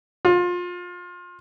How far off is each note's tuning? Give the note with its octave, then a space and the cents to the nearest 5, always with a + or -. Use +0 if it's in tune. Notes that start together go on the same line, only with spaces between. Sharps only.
F4 +25